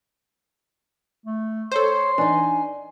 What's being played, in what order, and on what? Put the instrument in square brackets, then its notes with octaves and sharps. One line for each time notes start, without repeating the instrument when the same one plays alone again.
[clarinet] A3
[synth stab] A4 C5 [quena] C#5 [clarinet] C6
[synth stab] E3 [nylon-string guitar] D4 D#4 [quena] G#5